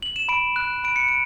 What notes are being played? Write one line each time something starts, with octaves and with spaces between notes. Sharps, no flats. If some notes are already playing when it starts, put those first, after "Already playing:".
F#7
E7
B5 D7
F#6
B5 D7
C#7
D7